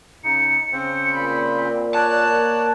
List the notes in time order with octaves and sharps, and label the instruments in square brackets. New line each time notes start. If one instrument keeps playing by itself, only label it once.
[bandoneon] C#3 D#4 [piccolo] C#7
[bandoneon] C#3 C4 C5
[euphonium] A#2 [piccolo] B5
[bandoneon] C#5 D5 [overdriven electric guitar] A5 [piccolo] F#6
[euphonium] A#3